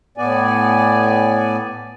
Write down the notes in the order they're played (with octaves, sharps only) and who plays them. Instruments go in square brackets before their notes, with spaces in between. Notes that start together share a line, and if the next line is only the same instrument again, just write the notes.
[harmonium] A2 B3 D5 G#5